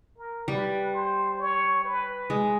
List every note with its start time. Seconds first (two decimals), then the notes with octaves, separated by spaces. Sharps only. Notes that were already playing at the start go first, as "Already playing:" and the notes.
0.18 A#4
0.48 G3 B4
0.93 C5
1.39 C#5
1.84 B4
2.30 G#3